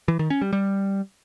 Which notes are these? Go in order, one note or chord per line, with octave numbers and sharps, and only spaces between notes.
E3
D#3
C#4
G3
G3